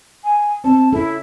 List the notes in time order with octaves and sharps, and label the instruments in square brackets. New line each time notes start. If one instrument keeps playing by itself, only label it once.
[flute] G#5
[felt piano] C4 [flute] A5
[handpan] C#4 [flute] E4 [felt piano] A4